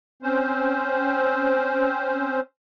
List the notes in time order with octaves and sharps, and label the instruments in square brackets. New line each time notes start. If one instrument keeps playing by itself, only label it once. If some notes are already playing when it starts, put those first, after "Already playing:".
[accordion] C4 C#4 C5